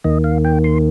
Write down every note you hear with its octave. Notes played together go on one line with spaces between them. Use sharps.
D#2 D#3 A#3 D#5
F5
G5
C6